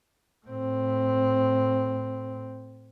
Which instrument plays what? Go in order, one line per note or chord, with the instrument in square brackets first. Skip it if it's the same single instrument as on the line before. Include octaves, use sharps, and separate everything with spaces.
[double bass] A2 C4